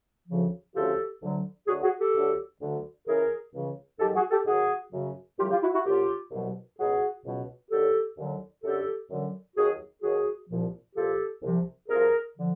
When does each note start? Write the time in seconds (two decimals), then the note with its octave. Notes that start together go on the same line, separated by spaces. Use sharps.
0.28 D2 C#3 F3
0.74 D2 C#3 F3 G4 A4
1.21 D2 D3 F#3
1.68 D2 D3 F#3 F#4 G#4
1.83 F#4 G#4
1.99 G4 A4
2.14 D2 D3 F#3
2.60 D2 D3 F#3
3.07 C#2 C#3 E3 G#4 A#4
3.53 C#2 C#3 E3
4.00 G#2 D#3 F#3 G4 A4
4.15 F#4 G#4
4.30 G4 A4
4.46 G#2 D#3 F#3 F#4 G#4
4.92 F#2 C#3 F#3
5.39 F#2 C#3 F#3 F4 G4
5.51 F4 G4
5.62 E4 F#4
5.73 E4 F#4
5.85 C2 B2 F#3 F4 G4
6.31 C2 B2 F#3
6.78 C#2 B2 F#3 F#4 G#4
7.24 C#2 B2 F#3
7.71 D#2 D3 F#3 G4 A4
8.18 D#2 D3 F#3
8.64 F#2 D3 F#3 G4 A4
9.10 F#2 D3 F#3
9.56 D#2 D#3 F#3 F#4 G#4
10.02 D#2 D#3 F#3 F#4 G#4
10.49 C2 A#2 F3
10.95 C2 A#2 F3 G4 A4
11.42 C2 C3 F3
11.88 C2 C3 F3 G#4 A#4
12.37 D3 F3